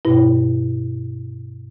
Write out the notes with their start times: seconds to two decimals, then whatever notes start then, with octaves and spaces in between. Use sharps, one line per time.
0.05 G2 B2 E4